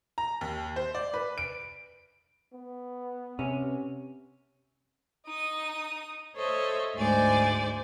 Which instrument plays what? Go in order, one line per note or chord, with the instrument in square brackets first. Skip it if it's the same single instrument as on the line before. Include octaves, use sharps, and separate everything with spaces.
[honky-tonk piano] A#5
D#2
C5
D5
B4
D7
[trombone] B3
[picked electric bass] C3 [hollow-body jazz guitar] C#4
[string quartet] D#4 D#6
A4 C5 C#5 D#5 E5
D2 G#2 G#3 C5 D5 G#5